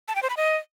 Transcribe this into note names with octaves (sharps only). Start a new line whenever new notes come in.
A5
G5
C5
B5
D#5